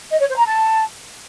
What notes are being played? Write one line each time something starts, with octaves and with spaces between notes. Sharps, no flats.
D#5
C#5
C5
A#5
A5